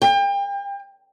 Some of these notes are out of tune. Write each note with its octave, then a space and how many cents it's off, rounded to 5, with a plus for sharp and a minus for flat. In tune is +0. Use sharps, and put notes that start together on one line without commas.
G5 +35